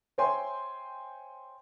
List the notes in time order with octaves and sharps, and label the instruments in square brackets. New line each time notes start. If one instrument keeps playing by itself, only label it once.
[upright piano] C5 C#5 E5 G5 G#5 C6